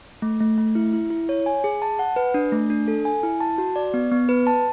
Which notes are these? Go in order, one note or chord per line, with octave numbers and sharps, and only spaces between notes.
A3
A3
A3
E4
E4
E4
C#5
G#5
G#4
A5
F#5
B4
D4
A3
D4
A4
G#5
E4
A5
F#4
D5
B3
B3
B4
A5